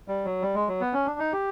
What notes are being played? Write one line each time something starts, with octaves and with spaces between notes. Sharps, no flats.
G3
F#3
G3
G#3
F#3
B3
C#4
D4
D#4
G4